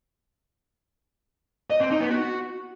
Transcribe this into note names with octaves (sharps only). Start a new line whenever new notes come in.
D#5
C4
D#4
B3
F#4